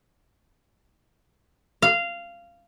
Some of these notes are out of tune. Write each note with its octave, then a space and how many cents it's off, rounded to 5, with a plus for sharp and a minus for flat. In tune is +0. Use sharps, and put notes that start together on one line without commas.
F5 -15